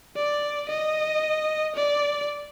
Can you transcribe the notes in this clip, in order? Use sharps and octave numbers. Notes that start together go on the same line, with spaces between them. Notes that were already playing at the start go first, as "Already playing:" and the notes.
D5
D#5
D5